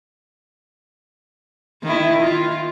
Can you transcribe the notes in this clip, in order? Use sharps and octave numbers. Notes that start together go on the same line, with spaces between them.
D#3 E4
F4